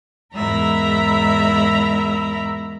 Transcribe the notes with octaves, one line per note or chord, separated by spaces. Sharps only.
E2 G#2 A#4 E5 A#5 B5